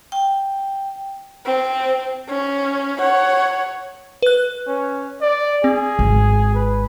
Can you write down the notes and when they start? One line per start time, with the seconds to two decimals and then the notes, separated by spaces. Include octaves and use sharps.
0.12 G5
1.46 C4
2.29 C#4
2.99 C#5 F#5
4.22 B4 F#6
4.67 C#4
5.22 D5
5.64 C4 G#4
5.99 G#1
6.55 B4